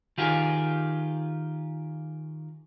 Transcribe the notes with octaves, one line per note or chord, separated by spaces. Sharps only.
D#3 F4 G4 G#4